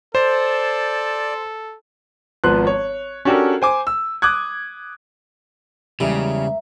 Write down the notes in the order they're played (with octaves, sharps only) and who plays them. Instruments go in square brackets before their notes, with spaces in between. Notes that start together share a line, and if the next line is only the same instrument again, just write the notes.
[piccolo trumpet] A4 [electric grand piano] C5 [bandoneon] D5
[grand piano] G#1 F3 B3 C6 F#6
C#5
C#4 D4 F#4 G4 A4 A#4
C5 G#5 D6
E6
D6 D#6 F#6 G#6
[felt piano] E2 G#3 [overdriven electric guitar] C#3 [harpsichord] G3 [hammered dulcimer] E5 A#5